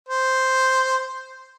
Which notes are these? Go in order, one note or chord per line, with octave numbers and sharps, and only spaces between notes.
C5